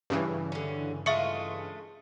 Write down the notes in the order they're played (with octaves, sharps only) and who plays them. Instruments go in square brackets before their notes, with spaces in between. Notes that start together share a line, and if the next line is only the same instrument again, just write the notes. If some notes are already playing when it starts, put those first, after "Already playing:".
[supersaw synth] G2 C#3 E3
[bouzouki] D3 C#4
[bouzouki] G#3 A3 F4 [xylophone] E5 C#6 C#7